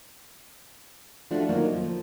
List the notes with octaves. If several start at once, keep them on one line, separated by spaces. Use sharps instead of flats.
F3 A3 D4 F4 F#4
F2 D#3 F#3 A#3 D#4
F3